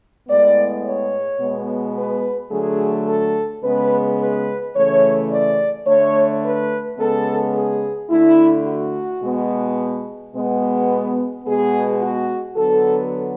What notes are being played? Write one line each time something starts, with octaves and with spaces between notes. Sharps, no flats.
A2 G#3 B3 D5
C#5
B2 G#3 B3
B4
D3 F#3 A3 G#4
A4
C#3 G#3 B3 B4
B4
C#3 E3 A3 C#5
D5
D3 A3 C#5
B4
C#3 G#3 B3 A4
G#4
D3 A3 E4
F#4
B2 G#3 B3
B2 G#3 B3
B2 G#3 B3 G#4
F#4
D3 F#3 B3 A4